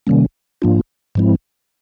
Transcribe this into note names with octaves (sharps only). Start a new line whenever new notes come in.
C3 D#3 G3 A#3 C#4
G#2 F3 A#3 D4 F4
G#2 F3 G#3 C4 E4